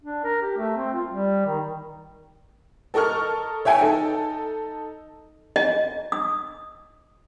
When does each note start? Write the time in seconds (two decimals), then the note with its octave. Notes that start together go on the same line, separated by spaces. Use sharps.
0.03 D4
0.24 A#4
0.42 G4
0.58 A3
0.76 C4
0.93 F4
1.09 G3
1.46 D#3
2.94 A4 A#4 D#5 C#6 F6
3.65 C#5 E5 G5 G#5
3.78 D#4 A4
5.56 D#5
6.12 D#6